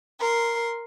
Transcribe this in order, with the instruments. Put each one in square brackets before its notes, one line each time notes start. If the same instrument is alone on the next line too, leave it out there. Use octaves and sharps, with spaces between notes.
[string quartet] A#4 C6